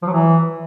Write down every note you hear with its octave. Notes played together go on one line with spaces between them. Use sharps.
F3
F#3
E3